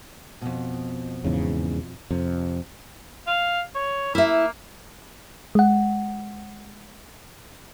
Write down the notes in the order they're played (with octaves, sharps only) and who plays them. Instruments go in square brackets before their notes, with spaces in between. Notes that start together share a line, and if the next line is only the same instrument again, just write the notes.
[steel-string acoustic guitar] F2 B2
[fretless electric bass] E2 G#2 C#3
[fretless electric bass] F2 [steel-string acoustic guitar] C3
[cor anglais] F5
C#5
[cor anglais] A#3 [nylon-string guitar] E4 E5
[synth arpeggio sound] G#3 F#5